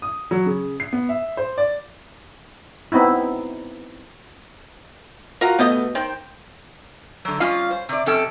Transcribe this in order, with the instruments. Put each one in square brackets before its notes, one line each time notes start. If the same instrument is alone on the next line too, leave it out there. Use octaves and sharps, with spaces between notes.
[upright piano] D#6
F#3
C#3
C7
B3
E5
C5
D5
[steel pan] B3 C4 D#4 E4
[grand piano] F4 F#4 [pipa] A#4 A#5
[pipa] B2 G4 D#5 [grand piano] A3 A5 G6 [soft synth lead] B3
[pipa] D#3 [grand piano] C5 [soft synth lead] G5
[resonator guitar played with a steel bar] D3 F#3
G3 C#4 F4 D#5 F5
C5
C3 D5
F2 C3 C#4 A4 G5 A5